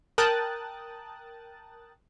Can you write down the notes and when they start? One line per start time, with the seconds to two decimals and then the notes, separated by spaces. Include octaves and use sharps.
0.18 A#4 G5 A5 D#6 F#6 A6